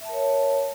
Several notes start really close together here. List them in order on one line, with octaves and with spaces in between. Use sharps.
E5 A5 A#4 C#5